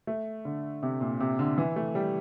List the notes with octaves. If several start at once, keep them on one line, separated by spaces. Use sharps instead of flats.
A3
D3
C3
A#2
C3
D3
E3
A3
G3